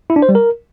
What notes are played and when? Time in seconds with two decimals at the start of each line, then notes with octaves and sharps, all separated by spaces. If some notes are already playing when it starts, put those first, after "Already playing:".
0.10 E4
0.16 D4
0.22 C5
0.29 G3
0.35 A#4